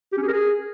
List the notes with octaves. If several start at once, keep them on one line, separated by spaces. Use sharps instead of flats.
G4
C#4
G#4
A#4
G#4